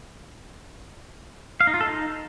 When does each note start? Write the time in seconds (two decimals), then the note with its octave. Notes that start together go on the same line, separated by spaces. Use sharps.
1.61 F5
1.67 D#4
1.74 F4
1.81 A4
1.87 D#4